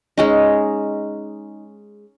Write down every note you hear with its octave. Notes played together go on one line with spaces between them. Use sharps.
G#3 C#4 D#4